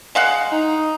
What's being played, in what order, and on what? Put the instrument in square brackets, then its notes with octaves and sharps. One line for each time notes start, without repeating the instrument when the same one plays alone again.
[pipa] G#3 F5 F#5
[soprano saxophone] D#4